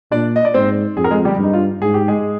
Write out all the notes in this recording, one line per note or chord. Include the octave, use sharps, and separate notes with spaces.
A#2 D4 D5
D#5
D5
G#2 C4 C5
F2 G#4
A#4
G#3 G#4
G3 G4
G2 D#4
F4
G#2 G#4
G4
G#3 G#4